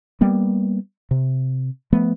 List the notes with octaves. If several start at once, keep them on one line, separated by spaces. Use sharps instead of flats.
G3 A#3 B3
C3
F3 A3 B3